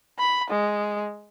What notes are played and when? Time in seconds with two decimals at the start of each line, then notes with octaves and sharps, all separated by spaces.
0.19 B5
0.50 G#3